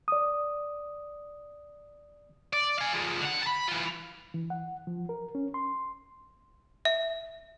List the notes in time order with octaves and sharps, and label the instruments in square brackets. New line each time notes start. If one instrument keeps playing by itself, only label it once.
[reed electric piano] D5 D#6
[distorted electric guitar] D5
F5 G#5
F3 G#3
D3 F#5
A5 B5
E3 F4
[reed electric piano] E3
F#5
F3
A#4
C#4
C6
[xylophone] E5